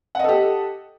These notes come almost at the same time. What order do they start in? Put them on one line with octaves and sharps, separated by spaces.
F#5 D#5 A4 G4